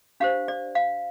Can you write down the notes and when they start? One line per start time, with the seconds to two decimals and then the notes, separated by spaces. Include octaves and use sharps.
0.20 D4 G4 C5 F5
0.48 D5
0.75 F5